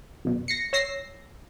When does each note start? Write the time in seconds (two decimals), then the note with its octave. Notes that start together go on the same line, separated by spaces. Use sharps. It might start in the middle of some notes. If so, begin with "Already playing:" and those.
0.25 F#2 B2
0.48 A#6 C7 C#7
0.73 C#5 E6 A#6 C7